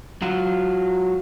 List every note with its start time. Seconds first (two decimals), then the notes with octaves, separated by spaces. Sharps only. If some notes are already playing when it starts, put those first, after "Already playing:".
0.22 F#3 F4